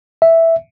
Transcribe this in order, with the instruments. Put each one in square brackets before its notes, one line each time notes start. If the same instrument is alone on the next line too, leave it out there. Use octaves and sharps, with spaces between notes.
[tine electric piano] E5